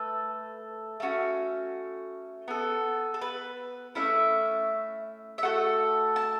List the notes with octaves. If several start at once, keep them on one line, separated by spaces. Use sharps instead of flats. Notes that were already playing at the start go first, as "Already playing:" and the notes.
Already playing: A3 A4 B4
A3 C#4 F#4
B3 A4
A4
B4
A3 C#4 E4 E5
E5
A3 F#4 A4 F#5
A5